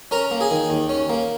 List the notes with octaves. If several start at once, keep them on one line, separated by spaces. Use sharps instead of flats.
C#4 A#4 A#5
A#3
G#4 G#5
D#3
D#2
C#4
A#3